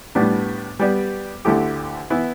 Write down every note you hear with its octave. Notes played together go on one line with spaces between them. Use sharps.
A2 G3 B3 D4
G3 B3 G4 D5
D2 D3 A3 E4 G4
E3 B3 E4